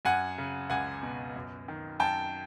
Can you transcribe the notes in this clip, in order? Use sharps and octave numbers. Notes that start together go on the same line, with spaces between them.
F#2 F#5 G#5
C#3
C#2 F#5 G#5
B2
F#2
D#3
F#2 G5 A5